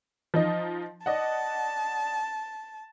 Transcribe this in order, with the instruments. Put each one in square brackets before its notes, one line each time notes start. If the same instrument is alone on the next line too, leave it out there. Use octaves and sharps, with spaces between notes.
[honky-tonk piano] F3 D#4 D#5
[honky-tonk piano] D5 D#5 F#5 [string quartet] A5